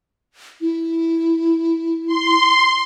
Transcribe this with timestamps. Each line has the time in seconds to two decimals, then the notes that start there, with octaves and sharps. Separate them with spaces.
0.61 E4
2.07 C6